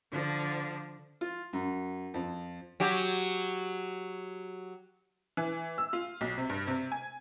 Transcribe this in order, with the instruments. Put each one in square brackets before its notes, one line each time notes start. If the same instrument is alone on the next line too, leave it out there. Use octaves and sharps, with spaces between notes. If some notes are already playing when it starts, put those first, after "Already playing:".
[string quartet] D3 F3
[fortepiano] F4
F#2
F2
[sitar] F#3 G4
[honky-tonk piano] E3
E6
F4
B1
C3
G2
C3
G#5